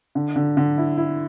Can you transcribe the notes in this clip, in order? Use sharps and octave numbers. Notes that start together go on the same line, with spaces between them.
D3
D3
D3
E4
E4